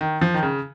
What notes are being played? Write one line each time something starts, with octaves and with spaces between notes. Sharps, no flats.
D#3
F3
D#3
C#3